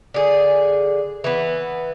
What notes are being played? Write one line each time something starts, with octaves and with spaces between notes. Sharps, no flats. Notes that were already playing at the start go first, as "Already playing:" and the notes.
D3 G#4
E3 B3